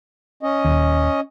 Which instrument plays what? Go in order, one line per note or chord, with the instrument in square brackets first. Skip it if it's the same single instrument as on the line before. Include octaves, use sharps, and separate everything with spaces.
[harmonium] C#4 D#5
[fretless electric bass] D#1 D#2